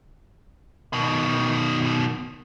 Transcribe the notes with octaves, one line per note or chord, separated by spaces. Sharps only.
B2 D#3